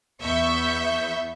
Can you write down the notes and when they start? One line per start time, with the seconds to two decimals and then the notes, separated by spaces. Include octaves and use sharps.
0.22 E2 B3 E5 C#6 G6